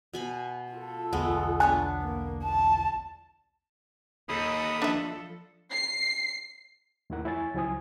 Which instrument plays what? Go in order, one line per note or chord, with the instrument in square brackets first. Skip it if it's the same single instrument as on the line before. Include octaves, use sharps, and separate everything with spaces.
[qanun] B2 G#5 B5
[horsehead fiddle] F4 A4
[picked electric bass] B1 E2 D3 [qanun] G#3 A3 B3
[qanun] B3 D4 C#5 [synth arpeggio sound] G#5 F#6
[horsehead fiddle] A#3
A5
[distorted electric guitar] D#2 [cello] A4 D#5 [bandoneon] B5 D#6
[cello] F3 A4 [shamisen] D4 E5
[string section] C7
[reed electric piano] D#2 D#3 A3 E4 A#4 F#5
F2 E4 C#5 G#5 A6
C#2 F#3 E4 C5 G#5 D#6